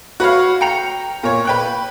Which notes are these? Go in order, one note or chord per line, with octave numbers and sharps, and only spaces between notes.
F#4 B4 C#5 F5
G5 A#5 C#7 F7
A#2 C#5
B4 G5 F#6